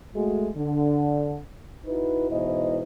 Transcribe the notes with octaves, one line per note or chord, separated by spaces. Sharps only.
G#3 A3 F#4
D3
D#4 E4 F#4 B4
G#2 B2 E3 E4 C5 D#5